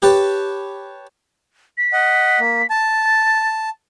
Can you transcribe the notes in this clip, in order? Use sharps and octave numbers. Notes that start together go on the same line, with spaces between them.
G4 B4 C#5 A5
B6
D#5 F#5
A#3
A5 A6